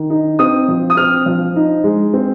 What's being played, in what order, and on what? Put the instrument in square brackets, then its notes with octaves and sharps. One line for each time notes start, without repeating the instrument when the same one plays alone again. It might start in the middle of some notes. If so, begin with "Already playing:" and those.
Already playing: [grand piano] D#3
D#4
C4 D#6
F3
D#6
C4 F6
F3
D#4
G#3
C4